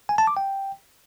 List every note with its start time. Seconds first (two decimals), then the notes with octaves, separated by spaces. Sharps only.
0.09 G#5
0.18 A5
0.27 D6
0.37 G5